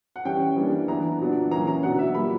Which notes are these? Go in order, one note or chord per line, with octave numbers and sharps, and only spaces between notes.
F#5
E3 G3 C#4 G5
E3 G3 A#3 D4
E3 B3 D4 A#5
A#2 F#3 B3 D4
E3 A#3 C#4 A#5
A#5
B2 F#3 B3 D4 F#5
E5
A#2 G3 A#3 B5